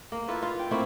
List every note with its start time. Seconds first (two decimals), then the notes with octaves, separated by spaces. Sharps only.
0.12 A#3
0.28 E4 F4 A4 B4
0.42 F4
0.59 G5
0.71 A3 A#3 C4 E4